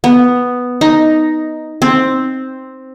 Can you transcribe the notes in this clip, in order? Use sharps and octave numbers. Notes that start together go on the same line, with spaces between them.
B3
D#4
C4